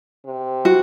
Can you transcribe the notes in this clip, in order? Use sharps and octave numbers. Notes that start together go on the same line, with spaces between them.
C3
F#4